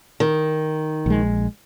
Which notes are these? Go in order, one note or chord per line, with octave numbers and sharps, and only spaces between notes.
D#3
A#1 G#3